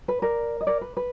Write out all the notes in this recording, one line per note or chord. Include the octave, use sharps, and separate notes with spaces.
B4
A#4 D5
D#5
A#4 D5
B4
B4